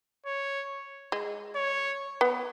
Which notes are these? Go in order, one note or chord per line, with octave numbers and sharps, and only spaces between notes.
C#5
G#3
C#5
B3